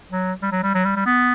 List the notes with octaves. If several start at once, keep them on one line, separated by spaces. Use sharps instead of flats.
F#3
G3
F#3
G3
F#3
G3
G3
B3